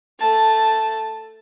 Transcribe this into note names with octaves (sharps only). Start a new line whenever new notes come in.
A3 A5